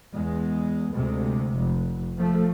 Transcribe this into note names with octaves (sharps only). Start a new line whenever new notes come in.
E2 G#3
D2 C3 G#3
F1
F3 A3